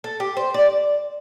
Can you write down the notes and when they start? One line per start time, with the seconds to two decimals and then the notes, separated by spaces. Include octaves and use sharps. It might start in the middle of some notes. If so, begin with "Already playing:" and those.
0.04 A4
0.20 G4
0.37 C5
0.54 D5